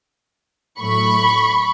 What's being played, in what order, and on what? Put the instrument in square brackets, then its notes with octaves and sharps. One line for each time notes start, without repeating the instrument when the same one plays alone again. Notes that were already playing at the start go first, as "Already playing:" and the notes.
[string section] A2 F#3 A3 B5 C#6